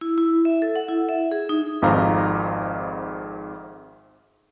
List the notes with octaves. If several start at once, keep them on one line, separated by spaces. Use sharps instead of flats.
E4
E4
E5
A4
F#5
E4
E5
G#4
D#4
G#1 F2 G#2 F5 A#5